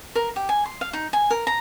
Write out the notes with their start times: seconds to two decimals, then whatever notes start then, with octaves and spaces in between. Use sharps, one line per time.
0.15 A#4
0.36 G4
0.49 G#5
0.66 C6
0.81 F5
0.93 D#4
1.13 G#5
1.30 A#4
1.47 A#5